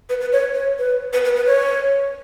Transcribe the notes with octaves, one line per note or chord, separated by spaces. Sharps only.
B4
B4
C#5
C#5
B4
B4
B4
B4
C#5